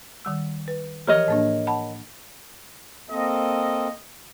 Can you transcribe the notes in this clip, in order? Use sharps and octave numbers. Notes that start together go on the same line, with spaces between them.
D#3 G3 E6
B4
E3 F3 G4 A#4 C#5 D#5
A2 A#3 D4
F#5 A5 B5
A#3 C4 A4 D#5